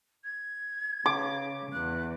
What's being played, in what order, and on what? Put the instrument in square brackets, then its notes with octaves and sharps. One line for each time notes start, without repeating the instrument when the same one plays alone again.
[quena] G#6
[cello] C#3 [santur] D6
[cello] E2 [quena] F#6